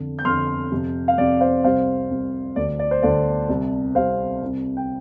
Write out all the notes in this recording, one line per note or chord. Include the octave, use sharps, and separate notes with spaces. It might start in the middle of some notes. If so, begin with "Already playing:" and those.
Already playing: F2 D3
G6
F2 D3 C6 F6
F2 C3
F5
F2 C3 D5
C5 F5
C2 C3 C5 F5
C2 C3
D2 D3 D5
D5
C5
D2 D3 D5
C2 C3
C2 C3 C5 F5
C2 C3
G5